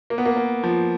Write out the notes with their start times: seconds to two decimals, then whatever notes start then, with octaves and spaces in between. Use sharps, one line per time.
0.10 A#3
0.18 B3
0.26 A#3
0.37 A#3
0.64 F3